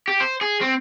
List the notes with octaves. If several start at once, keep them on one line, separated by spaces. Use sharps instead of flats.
G4
C5
G#4
C4